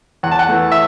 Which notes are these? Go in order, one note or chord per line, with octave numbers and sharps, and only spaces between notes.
E2 F#5
A5
F#5
E3 A3
E5